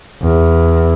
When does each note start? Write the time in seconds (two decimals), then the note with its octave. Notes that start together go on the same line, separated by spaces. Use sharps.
0.23 E2